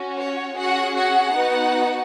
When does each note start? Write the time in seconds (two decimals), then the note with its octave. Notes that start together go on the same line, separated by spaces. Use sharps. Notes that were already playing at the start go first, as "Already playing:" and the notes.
Already playing: C#4 F#4
0.17 C#5
0.57 C#4 F#4 G#4 F#5
0.96 F#4 F#5
1.35 B3 D#4 F#4